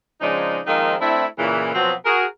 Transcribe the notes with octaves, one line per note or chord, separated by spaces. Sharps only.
C#3 F3 G#3 D4 D#4
D#3 F3 G#3 A#3 C4 D#4
A3 C4 D4 E4
A#2 C#3 E3
B2 F3 F#3 B3 C4
F#4 G#4 A#4